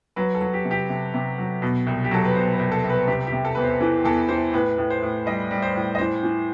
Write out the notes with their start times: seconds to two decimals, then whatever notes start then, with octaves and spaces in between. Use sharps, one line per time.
0.16 F#3 B4
0.35 A4
0.41 F#3
0.53 G4
0.65 C3
0.71 G4
0.89 C3
1.14 C3
1.38 F#3
1.62 B2
1.87 C2
2.04 G4
2.11 F#3 A4
2.25 B4
2.35 B2 C5
2.53 B4
2.59 C2
2.72 A4
2.84 C2
2.90 B4
3.07 C3 G4
3.27 G4
3.32 C3
3.45 A4
3.55 E2 B4
3.62 C5
3.80 E3 A4
4.05 E2 A4
4.29 E3 C5
4.53 A2 B4
4.78 A2
4.90 C5
5.03 A2
5.26 G3 D#5
5.51 G3
5.62 C5
5.75 A2
5.95 D#5
5.99 E3 C5
6.23 E3